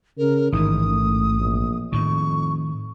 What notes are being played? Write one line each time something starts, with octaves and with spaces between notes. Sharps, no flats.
C#3 A#4
A1 G#2 D#3 E3 D#6
A3
A#1
F2 A2 D#3 C#6